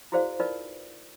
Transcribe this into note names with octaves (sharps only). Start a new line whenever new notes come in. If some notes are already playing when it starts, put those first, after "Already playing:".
E4 F#4 G#4 C5 D5 F5
D#4 F4 A#4 B4 D5